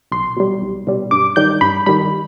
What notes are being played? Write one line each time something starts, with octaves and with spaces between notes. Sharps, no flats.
B1 C6
B2 G3
B1
B2 G3
G2 D6
D#3 G3 G6
G2 B5
D#3 G3 B5